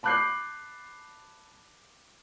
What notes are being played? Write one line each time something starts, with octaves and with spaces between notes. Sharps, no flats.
A5 B5 D6 F#6 G6 C7